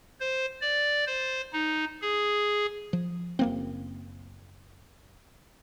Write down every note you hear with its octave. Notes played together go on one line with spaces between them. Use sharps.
C5
D5
C5
D#4
G#4
F3
F#1 A#3 C4